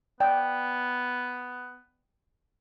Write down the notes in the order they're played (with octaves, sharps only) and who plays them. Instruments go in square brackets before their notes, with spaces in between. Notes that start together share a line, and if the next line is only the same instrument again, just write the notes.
[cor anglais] B3 [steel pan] D5 G5